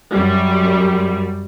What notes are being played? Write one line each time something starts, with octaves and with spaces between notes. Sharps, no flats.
F#2 G3